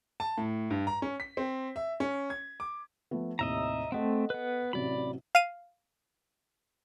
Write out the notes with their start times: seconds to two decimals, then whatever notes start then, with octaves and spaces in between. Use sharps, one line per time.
0.20 A5
0.38 A2
0.70 G2
0.87 A#5
1.02 C#4
1.20 B6
1.37 C4
1.76 E5
2.00 C#4
2.30 G#6
2.60 D6
3.11 F3 A3 B3
3.39 D#2 A2 C3 D#5 E5 A#5
3.92 A3 C4 A4 D#5 F#5
4.30 B3 B4
4.73 A1 C3 F#3 D5 B5
5.35 F5 D#7